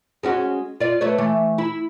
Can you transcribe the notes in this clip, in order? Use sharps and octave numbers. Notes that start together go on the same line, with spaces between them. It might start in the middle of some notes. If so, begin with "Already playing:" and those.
G#3 C#4 F#4
F4 D5
A3 B4 C#5
E3 A3
E4